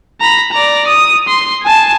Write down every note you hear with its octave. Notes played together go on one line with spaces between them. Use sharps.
A#5 B5
D5 A#5
D#6
C6
G#5 A5